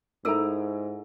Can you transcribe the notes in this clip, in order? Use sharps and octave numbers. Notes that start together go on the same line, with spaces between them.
G#2 D#4 E4 A4 A#4 A#5 E6